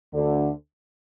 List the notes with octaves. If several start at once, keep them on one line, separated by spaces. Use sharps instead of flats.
D2 D3